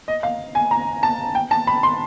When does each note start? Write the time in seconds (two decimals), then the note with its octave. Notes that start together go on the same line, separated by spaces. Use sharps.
0.08 D#5
0.23 F5
0.55 G#5
0.71 A#5
1.03 A5
1.35 G5
1.51 A5
1.67 B5
1.83 C6